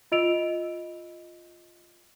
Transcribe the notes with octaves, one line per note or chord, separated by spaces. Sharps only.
F4 D#5 E6 D7 F7